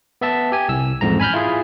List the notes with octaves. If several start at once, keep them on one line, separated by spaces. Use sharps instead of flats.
B3 E5 A5
G4 G#5
C2 E6
A1 F2 G#2 A#5
G#5 B5 F6 G6
E4 F4 G#4